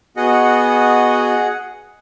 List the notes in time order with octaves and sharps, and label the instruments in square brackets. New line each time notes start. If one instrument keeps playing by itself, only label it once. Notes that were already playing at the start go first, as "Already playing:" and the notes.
[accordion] B3 F#4 D#5 [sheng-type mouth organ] G#4 F#5